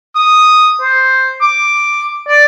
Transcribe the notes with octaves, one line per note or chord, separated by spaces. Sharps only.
D#6
C5
D6
D5